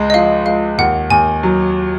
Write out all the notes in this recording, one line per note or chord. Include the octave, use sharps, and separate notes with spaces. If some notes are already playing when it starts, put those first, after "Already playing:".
Already playing: C#2 G#3
D#5
F3 F5
G#3 F5
D#2 F#5
D#2 G#5
F#3